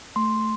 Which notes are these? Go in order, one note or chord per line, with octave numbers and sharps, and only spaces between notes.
A3 C6